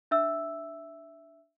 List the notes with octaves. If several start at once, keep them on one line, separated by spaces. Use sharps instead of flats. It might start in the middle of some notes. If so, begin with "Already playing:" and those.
D4 E5 E6